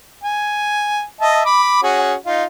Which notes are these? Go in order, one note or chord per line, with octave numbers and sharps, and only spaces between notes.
G#5
D#5 E5 A5
B5 D6
C#4 F#4 G#4
D#4 F4